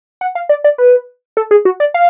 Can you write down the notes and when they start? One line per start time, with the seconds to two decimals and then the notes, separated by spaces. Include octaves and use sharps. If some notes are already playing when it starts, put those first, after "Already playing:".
0.21 F#5
0.35 F5
0.49 D5
0.64 D5
0.78 B4
1.37 A4
1.51 G#4
1.65 F#4
1.80 D5
1.94 F5